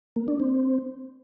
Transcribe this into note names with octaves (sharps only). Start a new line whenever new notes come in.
A#3
D4
C4